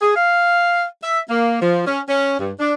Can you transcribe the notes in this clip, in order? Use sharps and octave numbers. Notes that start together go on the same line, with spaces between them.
G#4
F5
E5
A#3
F3
C#4
C#4
G2
D4